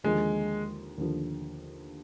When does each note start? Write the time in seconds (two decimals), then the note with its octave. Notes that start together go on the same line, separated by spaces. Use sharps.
0.04 D#2 D3 F3 G#3
0.98 D#2 D3 F3